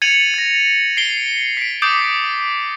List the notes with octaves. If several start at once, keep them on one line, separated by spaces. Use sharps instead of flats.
G#6 A6 C#7 D#7 F7 F#7
A6 A#6
C7 D7 G7
B6 D7
D6 D#6 G6 A6 C7 D7